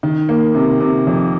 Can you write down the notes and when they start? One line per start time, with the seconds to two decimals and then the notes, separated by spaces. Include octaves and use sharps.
0.03 D#3
0.29 A#3
0.55 C3
0.81 C3
1.07 F2